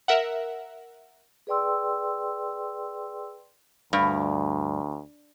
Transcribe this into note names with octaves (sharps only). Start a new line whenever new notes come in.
A#4 E5 F#5
G#4 B4 D5 G5 C6 E6
D2 G2